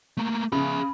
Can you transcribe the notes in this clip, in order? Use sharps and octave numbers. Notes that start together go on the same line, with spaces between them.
A3 A#3
C#3 G#4 E5 B5